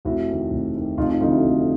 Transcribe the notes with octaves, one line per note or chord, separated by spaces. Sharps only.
F1 E4 F#4
D#2 D#3
F1
D#2 D#3
F1 D#4 F4
D#4 F4
F2 D3 D#4 F4
E4 F#4
F1